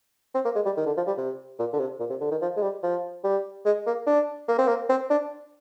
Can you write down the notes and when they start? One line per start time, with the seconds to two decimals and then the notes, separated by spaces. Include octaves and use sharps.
0.35 C4
0.45 A#3
0.55 G#3
0.65 G3
0.77 D#3
0.86 D3
0.97 F3
1.07 G3
1.18 C3
1.59 A#2
1.73 D3
1.80 C3
2.00 A#2
2.10 C3
2.21 D3
2.31 D#3
2.41 F3
2.56 G#3
2.62 G3
2.83 F3
3.24 G3
3.65 G#3
3.86 A#3
4.07 D4
4.48 A#3
4.58 C4
4.68 A#3
4.89 C4
5.10 D4